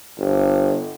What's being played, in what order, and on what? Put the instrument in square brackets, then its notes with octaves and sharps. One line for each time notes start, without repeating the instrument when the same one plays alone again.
[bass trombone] G1